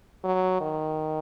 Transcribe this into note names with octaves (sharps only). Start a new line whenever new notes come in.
F#3
D#3